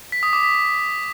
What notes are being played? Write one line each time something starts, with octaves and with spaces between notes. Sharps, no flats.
B6
D#6
D6
B6